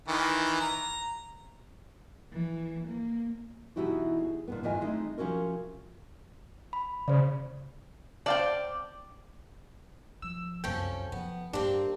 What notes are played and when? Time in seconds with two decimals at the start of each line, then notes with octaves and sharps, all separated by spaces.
0.08 D#3 E3
0.61 A#5
2.33 E3
2.88 A#3
3.76 B2 E3 D#4 E4 F#4 G4
4.19 G#4
4.48 A#2 D3 B3
4.63 G#2 D#3 E3 F4 D#5 G#5
4.81 G#3 A3 C4 D#4
5.18 C3 F3 G3 C#4 F#4 A#4
6.73 B5
7.08 C#3 C5 D5
8.26 C4 D5 F5 G5 A5
10.22 F3 E6
10.64 C2 F#2 F3 C#4 A4 G5
11.12 F3 B3
11.53 G2 A#3 C4 D4 G4